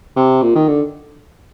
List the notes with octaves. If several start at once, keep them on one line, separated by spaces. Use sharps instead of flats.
C3
A#2
D#3
D3